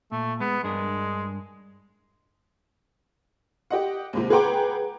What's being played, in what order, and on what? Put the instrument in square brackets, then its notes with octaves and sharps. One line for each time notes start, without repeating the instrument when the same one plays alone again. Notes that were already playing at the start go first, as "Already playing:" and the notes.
[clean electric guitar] A#2 [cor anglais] A3
[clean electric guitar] G#3 [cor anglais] B3
[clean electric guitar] G2 D4 A#4 [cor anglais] G#3
[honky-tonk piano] G4 D#5 F#5
D#2 G#2 C3
G#4 B4 F#5 G5 A#5 D6